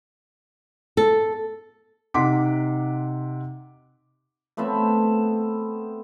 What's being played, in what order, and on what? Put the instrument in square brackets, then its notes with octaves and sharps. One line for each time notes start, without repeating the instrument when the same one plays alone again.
[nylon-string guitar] A4
[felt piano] C3 D#4 F#5 C6 D6 B6
[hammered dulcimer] A3 B3 C4 E5